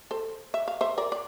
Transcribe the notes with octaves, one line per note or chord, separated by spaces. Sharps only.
A4 C5
E5
F5
C5 E5
A#4 D5
D5